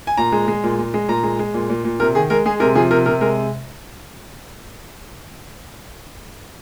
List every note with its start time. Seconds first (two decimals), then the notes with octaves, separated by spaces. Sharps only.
0.07 G#5
0.18 A#2 A#5
0.32 G#3
0.48 G#3
0.63 A#2
0.78 A#2
0.94 G#3
1.09 A#2 A#5
1.23 G#3
1.39 G#3
1.54 A#2
1.69 A#2
1.84 A#2
2.00 C3 A#4
2.15 D#3 G#4
2.30 G#3 A#4
2.46 G#3 G#4
2.60 C3 A#4
2.75 F3 G#4
2.91 C3 A#4
3.06 C3 A#4
3.21 G#3 A#4